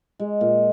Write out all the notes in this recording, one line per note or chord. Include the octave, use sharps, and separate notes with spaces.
G#3
A#2